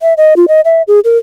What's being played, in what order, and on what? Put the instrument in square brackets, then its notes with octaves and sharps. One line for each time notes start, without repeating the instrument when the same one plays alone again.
[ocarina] E5
D#5
F4
D#5
E5
G#4
A#4